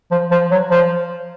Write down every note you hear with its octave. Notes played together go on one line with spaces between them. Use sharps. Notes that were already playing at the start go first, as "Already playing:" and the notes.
F3
F3
F#3
F3